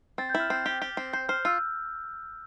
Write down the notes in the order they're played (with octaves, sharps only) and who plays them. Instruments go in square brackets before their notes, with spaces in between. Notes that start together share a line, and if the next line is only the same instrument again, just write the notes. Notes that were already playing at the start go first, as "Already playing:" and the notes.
[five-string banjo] C4 [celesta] A6
[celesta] G6
[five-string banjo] E4
[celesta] F6
[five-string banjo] C4 [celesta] G6
[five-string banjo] G4
G4
C4
[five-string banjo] C5 [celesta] G6
[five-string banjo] C5 [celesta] F6
[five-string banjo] F4 [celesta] E6